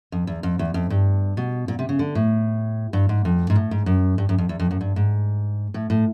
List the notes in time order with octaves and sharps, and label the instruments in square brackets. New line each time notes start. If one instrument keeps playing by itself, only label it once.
[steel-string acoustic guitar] F2
E2
F2
E2
F2
G2
B2
A#2
C3
C#3
D3
A2
G2
G#2
F2
G#2
A2
G#2
F#2
G2
F#2
F2
E2
F2
F#2
G2
G#2
A2
A2